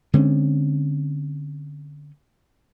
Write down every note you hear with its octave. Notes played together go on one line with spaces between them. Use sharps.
D3 G#3 C4 C#4